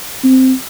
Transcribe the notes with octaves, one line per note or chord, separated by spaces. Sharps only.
C4